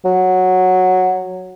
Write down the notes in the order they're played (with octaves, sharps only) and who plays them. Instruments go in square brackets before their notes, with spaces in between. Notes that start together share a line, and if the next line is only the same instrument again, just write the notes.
[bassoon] F#3